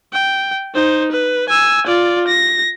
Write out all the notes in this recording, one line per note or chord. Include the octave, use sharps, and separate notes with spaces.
G5
D#4 C5
B4
G#5 E6
F4 D5
A#6